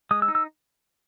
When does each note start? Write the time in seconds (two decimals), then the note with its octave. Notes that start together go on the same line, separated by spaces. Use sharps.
0.11 G#3 D#6
0.22 E6
0.28 D#4
0.35 E6